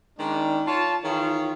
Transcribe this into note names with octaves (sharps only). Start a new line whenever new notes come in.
D#3 G#3 C#4 D4
F4 C#5 A5
D#3 E3 F4 G#4 C#5